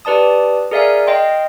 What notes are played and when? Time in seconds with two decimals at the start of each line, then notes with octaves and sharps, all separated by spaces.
0.05 G4 B4 D5 A5 D#6
0.71 G#4 A#4 D5 E5 F5 G#5
1.07 D#5 F5 G5 C6